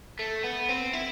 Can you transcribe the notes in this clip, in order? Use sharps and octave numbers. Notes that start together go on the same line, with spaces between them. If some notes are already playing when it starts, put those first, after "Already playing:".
A3
B3
C4
E4